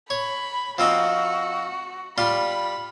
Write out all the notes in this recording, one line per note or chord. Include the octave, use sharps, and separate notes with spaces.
C#5 B5
F3 C4 D#4 F#4
G3 F4 B5 C6